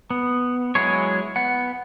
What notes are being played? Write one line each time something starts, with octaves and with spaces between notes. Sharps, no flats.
B3
F#3 G#3 E4 G#4 C#5
B3 F#5